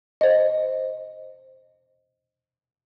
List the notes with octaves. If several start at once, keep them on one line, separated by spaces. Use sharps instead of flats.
C5 D#5